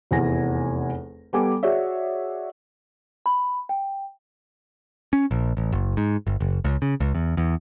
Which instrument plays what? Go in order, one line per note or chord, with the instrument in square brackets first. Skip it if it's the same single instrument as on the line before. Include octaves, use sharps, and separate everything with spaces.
[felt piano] F1 E2 E3 F#5 G#5 A#6
G3 B3 A4 G#5 D6
F#4 G#4 C#5 D5 E5
[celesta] B5
G5
[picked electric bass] C#4
A#1
A1
F#1
G#2
G1
F#1
C#2
C#3
C#2
E2
E2